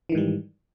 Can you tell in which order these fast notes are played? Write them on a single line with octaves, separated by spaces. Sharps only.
E3 D#3 G#2 G3